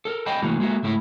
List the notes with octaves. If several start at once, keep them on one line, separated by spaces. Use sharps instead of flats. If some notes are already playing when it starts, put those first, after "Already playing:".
A4 A#4
C5 D5 D#5 G5 A5 B5
C3 E3 A3 A#3 F#4
G#3 A#3 F#4 A4 E5
C#2 G#2 A3 E4